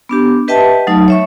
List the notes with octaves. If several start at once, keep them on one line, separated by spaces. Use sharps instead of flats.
B3 D4 G4
G4 B4 D#5 E5 G5 A5
F#3 A3 D#4
C#5 E5 C#6